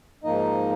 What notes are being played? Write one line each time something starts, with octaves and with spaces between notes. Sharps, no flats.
G#2 F3 A#3 D#4 D#5